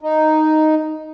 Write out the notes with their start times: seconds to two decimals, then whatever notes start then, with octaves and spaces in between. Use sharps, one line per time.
0.01 D#4